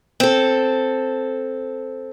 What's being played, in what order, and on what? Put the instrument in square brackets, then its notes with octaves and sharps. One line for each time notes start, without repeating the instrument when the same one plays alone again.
[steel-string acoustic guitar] C4 A4